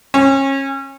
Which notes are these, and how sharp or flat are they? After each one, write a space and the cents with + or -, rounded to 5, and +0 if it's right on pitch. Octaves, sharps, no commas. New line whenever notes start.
C#4 -30